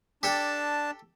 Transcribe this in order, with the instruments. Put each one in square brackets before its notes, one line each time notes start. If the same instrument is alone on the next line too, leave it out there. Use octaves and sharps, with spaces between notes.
[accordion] D4 A5 [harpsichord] G4 A4 G5